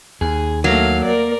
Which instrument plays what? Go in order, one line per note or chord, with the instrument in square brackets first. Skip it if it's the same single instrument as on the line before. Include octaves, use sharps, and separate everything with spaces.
[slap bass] D#2 [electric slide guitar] G#4
[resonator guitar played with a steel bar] F#3 [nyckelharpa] A3 F5 [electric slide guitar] A#3
[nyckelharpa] A#4 D5